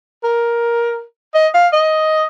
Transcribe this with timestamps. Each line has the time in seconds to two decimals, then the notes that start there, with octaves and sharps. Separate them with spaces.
0.24 A#4
1.34 D#5
1.54 F5
1.73 D#5